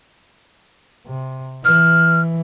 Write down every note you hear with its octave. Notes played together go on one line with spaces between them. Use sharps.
C3
E3 F6